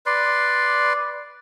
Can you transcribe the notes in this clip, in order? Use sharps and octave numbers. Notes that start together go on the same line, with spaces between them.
B4 D5 C6